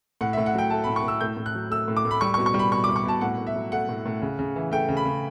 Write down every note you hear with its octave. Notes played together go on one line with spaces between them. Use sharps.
A2 F#5
E5
A2
F#5
F#3 G5
A3 A5
A2 B5
C#6
A2 E6
A2 G6
A2
F#6
F#3
A3 E6
A2
D6
A2
B5
G3 C#6
C#6
B2
C#6
G3
B5
B2 C#6
D6
G3
C#6
B2 A5
A2 F#5
A2
E5
F#3
A3 F#5
A2
A2
C#3
C#3
E3
A3 G5
C#3
B5
C#3